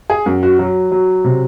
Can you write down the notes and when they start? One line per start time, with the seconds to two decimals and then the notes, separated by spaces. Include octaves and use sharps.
0.10 G#4
0.26 F#2
0.43 F#4
0.59 F#3
0.92 F#3
1.24 C3